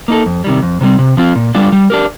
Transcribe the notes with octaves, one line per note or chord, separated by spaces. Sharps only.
A#3 D#4 A4
F2
C3 D#3 G3
F2
C3 D#3 G3 C4
C3
F3 C4 F4
A#2
G3 D4 F4
G3
D4 G4 A#4